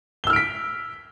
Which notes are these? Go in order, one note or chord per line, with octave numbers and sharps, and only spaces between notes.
E6 F6 B6 D7 G7